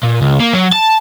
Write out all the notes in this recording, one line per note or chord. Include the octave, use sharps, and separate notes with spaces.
A#2
C#2
A#3
F#3
A5